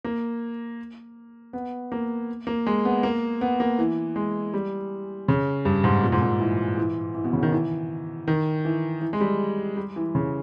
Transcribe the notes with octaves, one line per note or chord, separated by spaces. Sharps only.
A#3
B3
A#3
A#3
G#3
B3
A#3
B3
A#3
E3
G#3
G3
C#3
G2
G#2
A#2
G#2
A#2
E3
E3
E3
B2
C#3
D#3
E3
D#3
E3
E3
G#3
G3
G3
E3
C#3